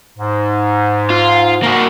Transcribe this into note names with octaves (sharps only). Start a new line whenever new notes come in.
G#2
F4
A#3 F#4